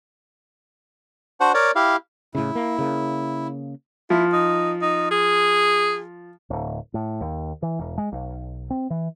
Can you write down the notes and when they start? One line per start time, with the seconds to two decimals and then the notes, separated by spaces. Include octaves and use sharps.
1.40 D4 F#4 C5 F#5
1.54 A#4 C#5 D5
1.75 E4 G4 F5
2.35 A2 C#3 E4
2.55 A#3
2.78 C#3 A#3
4.10 F3 E4
4.33 D#4
4.81 D#4
5.11 G#4
6.50 D1
6.94 A2
7.21 D#2
7.62 E3
7.79 E1
7.98 G#3
8.12 B1
8.70 C4
8.90 E3